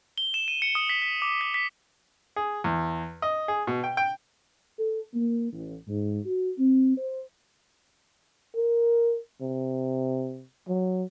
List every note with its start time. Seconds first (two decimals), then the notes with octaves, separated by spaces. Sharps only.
0.18 G7
0.34 E7
0.48 D#7
0.62 C#7
0.75 D#6
0.89 B6
1.02 B6
1.22 D6
1.41 B6
1.54 B6
2.36 G#4
2.64 E2
3.22 D#5
3.48 G#4
3.67 B2
3.84 G5
3.97 G5
4.79 A4
5.14 A#3
5.53 A1
5.88 G#2
6.25 F#4
6.59 C4
6.98 C5
8.56 A#4
9.42 C3
10.68 F#3